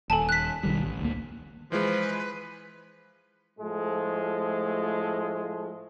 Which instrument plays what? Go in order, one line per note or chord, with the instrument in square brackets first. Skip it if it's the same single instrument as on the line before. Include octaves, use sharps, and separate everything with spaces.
[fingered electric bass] D#1 [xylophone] A4 G#5 A5
[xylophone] F#6 B6
[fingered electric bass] B1 D#3 G3
A1
D2 A#3
[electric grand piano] E3 G#3 [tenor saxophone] F3 [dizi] B4
[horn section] A2 F3 G#3 A3